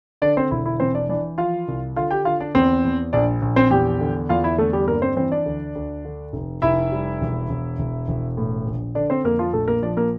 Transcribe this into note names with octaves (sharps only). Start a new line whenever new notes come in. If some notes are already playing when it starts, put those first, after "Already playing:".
D3 D4 D5
C4 C5
E1 E4
E4
E3 C4 C5
D4 D5
E3 D4 D5
F3 F4 F5
C2
D3 F4 F5
G4 G5
D3 F4 F5
D4 D5
E2 C4 C5
E2
A#1 D4 D5
A#1
C4 C5
E2 G4 G5
D3
E2 F4 F5
E4 E5
D3 A3 A4
G3 G4
G2 A#3 A#4
C4 C5
E3 C4 C5
D4 D5
D2
D2
D3
F1
F1 E4 E5
G3
E1
E1
E1
E1
A2
A#1
D3 D4 D5
C4 C5
F2 A#3 A#4
F3 F4
A#1 A3 A4
A#3 A#4
F3 D4 D5
A#3 A#4